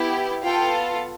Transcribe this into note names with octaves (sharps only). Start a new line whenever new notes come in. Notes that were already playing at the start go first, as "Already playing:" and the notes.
Already playing: B3 E4 G4
B3 F4 A4 G5